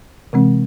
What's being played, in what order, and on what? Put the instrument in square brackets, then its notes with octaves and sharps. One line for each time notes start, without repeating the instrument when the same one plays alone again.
[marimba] C3 E3 G#3 C4